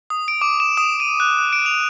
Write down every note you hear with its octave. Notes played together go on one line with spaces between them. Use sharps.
D#6
D7
D6
E7
D#6
D#7
F#6
F#6
D7
F7